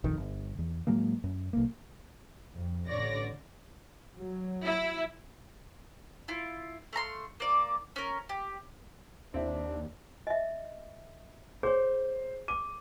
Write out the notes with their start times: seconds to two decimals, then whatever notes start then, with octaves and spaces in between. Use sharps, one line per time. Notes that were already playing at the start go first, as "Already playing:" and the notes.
0.04 A#1 F2 D#3
0.17 G1
0.59 E2
0.87 A2 F#3 G#3 A#3
1.24 F#2
1.53 B1 A#3
2.54 F2
2.88 A1 D3 C#5 D5 A#6
4.13 F#3
4.66 E4
6.28 E4 F4
6.93 A3 F5 A#5 C6
7.40 A#3 D5
7.96 C#4 A#4
8.29 G4
9.34 D#2 C4 D4 E4
10.27 D#5 E5
11.63 G#4 C5 C#5
12.48 D6 D#7